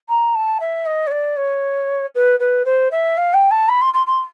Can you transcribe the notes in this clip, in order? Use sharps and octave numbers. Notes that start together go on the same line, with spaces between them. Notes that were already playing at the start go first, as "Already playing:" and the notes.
A#5
A5
E5
D#5
C#5
D5
C#5
B4
B4
C5
E5
F5
G5
A5
B5
C6
C6
C6